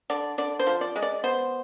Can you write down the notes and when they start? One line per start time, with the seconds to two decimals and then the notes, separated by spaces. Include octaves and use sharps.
0.10 D3 D5
0.38 D3 D5
0.59 C5
0.67 F3
0.81 D5
0.96 G#3
1.02 D5
1.24 B3 C5